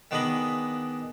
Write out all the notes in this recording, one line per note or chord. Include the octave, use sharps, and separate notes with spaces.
D#3 B3 D4 G#4 D#5 B5